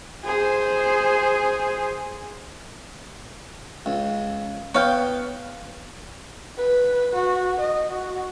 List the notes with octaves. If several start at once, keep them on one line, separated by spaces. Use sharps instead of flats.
G#4 C5
C#2
B3 C#5 F5 G5
B4
F#4
D#5
F#4